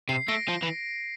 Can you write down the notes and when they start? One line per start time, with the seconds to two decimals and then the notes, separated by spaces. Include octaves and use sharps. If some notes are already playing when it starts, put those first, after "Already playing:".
0.09 C3 C7
0.28 A3 A#6 D7
0.48 F3
0.63 E3